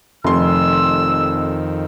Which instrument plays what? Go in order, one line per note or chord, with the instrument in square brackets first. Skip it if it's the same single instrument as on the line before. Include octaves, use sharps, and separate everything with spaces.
[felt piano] F1 C6 [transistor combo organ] F2 D#3 [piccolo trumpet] E6